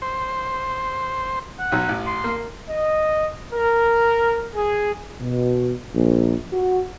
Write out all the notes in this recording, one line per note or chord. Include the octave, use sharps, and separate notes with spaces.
C5
F#5
B1 F#3
A1
C6
A#3
D#5
A#4
G#4
B2
A#1
F#4